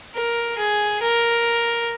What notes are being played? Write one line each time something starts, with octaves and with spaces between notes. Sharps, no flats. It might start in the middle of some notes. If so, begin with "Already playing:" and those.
A#4
G#4
A#4